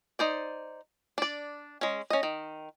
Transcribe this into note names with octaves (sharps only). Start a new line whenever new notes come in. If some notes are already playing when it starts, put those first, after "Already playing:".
D#4 C5 D5
D4 D5
G#3 C#4
C#4 D#5
D#3